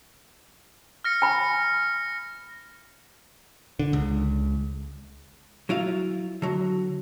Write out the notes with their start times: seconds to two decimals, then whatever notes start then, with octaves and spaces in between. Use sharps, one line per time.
1.04 F6 A#6 C#7
1.22 G#5 B5 C#7
3.79 D3
3.93 C#2
5.69 F#3 E4 F4 F5
6.42 D3 F#3